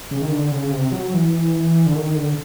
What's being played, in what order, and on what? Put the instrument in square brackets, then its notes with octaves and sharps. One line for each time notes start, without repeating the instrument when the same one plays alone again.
[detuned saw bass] C#3
D#3
D3
C#3
C3
F#3
E3
D3
D#3
D3